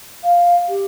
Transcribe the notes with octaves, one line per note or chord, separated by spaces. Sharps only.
F5
G4